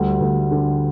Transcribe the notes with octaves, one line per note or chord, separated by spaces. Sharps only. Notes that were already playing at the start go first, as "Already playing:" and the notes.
Already playing: D2 G3
D2
D3